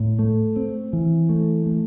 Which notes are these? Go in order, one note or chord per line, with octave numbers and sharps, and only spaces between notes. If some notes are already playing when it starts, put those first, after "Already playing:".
Already playing: A2
A3
C4
E3
A3
A3